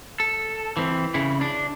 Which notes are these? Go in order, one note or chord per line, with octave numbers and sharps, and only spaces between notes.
A4
E3 C4
C#3 E4
D4